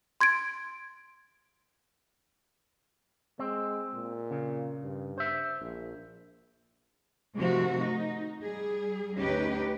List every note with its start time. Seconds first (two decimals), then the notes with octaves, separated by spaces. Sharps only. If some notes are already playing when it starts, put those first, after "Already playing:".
0.21 C6 G#6 A6 D7
3.39 G#3 C4
3.93 A#2
4.31 C#3
4.83 G2
5.18 C5 E5
5.61 A#1
7.37 C3 D#3 F3 A3 C4 F#4
7.82 D#4
8.42 G3 G#4
9.18 D2 C#4 D#4 G4 B4